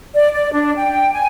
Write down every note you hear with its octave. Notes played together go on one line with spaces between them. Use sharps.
D5
D5
D4
G5
G#5